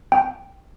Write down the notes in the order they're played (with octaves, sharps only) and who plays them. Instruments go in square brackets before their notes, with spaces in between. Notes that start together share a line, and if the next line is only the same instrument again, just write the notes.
[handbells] G5